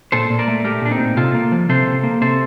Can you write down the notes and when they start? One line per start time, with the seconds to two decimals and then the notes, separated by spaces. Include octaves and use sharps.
0.12 A#2 A4 C5
0.30 A#2
0.39 A#4 D5
0.48 A3
0.64 A3 G4 A#4
0.82 A#2 D4
0.91 C4 D#4
1.00 A#2
1.17 C3 F4 A4
1.35 A#3
1.52 F3
1.69 C3 A4 C5
1.87 C3
2.04 A#3
2.21 C3 A4 C5